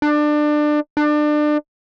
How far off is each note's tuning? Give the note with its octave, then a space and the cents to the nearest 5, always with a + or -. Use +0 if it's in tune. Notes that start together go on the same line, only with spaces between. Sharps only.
D4 +25
D4 +30